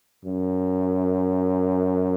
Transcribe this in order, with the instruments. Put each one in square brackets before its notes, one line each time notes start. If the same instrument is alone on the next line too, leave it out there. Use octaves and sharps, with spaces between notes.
[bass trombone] F#2